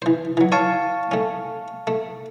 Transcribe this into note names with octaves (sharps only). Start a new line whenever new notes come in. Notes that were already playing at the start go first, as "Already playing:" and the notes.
E3 C5
E3 F#3
C#5 F5 A5 C#6 D#6
A3 C#4
A3